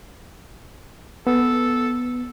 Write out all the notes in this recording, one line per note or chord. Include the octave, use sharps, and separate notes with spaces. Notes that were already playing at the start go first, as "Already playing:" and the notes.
B3 A4